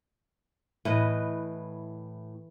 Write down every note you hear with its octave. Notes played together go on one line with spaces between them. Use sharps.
A2 E3 B4 D#5